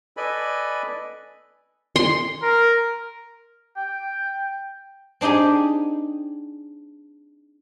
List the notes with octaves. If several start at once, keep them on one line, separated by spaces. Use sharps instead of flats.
A4 B4 D5 D#5 G#5 B5
C6
A#4
G5
C4 D4 D#4 G4 G#4